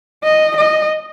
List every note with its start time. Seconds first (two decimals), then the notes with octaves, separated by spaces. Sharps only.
0.24 D#5
0.57 D#5